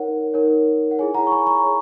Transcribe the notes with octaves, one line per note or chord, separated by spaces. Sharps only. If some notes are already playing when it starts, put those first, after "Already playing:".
Already playing: D#4 A#4 C#5 F#5
D#4 A#4 C#5
F#5
E4 G#4 C#5 G#5
F#5 A#5
C#6
G#5 B5
A#5 C#6
G#4 C#5